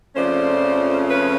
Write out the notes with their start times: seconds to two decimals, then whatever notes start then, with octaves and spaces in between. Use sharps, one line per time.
0.15 F2 C#3 F3 A3 C#4 C5 D5
1.08 B4 C#5